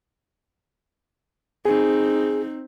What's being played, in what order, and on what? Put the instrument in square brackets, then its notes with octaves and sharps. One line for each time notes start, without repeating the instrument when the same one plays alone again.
[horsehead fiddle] C4 D#4 [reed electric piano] G#4